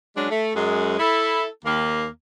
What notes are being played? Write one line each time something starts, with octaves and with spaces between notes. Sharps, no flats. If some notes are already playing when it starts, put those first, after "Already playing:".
F#3 G#3 C#4 D4
A3
F#2 G#3
E4 A4
D#2 A#3